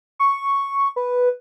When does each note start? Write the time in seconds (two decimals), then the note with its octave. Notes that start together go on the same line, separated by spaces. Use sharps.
0.19 C#6
0.96 B4